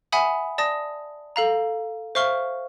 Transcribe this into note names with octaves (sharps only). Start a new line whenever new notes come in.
E5 F#5 G#5 B5 D#6
D5 A5 D#6 A#6
A4 F5 A#5
C5 E5 F5 C#6 F6 G7